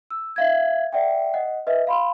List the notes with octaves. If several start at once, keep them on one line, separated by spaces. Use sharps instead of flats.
E6
E5 F5 G#6
D5 E5 F#5 G5
D#5 F#5
B4 D#5 E5
F5 B5 C6